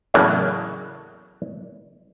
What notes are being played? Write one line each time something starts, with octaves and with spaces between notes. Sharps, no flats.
E2 A2 C#3 F#3 A#3